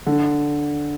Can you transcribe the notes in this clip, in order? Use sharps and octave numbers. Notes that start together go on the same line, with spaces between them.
D3